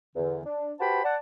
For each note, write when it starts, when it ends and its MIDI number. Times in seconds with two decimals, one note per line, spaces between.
0.16 0.43 40
0.16 0.43 50
0.44 0.71 62
0.80 1.02 66
0.80 1.02 67
0.80 1.02 71
0.80 1.02 72
0.80 1.02 81
0.80 1.02 83
1.04 1.16 74
1.04 1.16 78
1.04 1.16 81